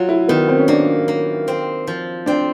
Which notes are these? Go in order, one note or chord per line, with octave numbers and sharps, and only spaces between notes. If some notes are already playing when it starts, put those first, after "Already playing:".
Already playing: F#3 F4
E4
D#3 B3
C4
C#4
A#3 D4
A#3
C4
F3
C4 D4